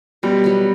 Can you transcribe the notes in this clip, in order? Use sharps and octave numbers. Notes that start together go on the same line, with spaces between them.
B2 G3
F#3 B3